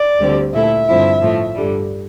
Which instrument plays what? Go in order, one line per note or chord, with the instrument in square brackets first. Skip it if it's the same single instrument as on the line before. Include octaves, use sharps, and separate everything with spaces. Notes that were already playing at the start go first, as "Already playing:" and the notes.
Already playing: [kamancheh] D5
[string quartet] D2 D3 G3 C4 G4
[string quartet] A#2 A3 E4 A4 [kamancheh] E5
[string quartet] G2 D3 F3 C4 E4
A2 F3 A3
G2 D3 G3